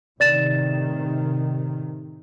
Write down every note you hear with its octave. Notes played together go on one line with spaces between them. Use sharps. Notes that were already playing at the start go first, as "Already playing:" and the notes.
A2 C3 D#3 D5 A6 E7